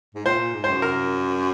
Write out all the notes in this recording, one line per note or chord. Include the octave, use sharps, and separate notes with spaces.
G#2
A#2 C5
A#2
G#2
C5
F#2
A#4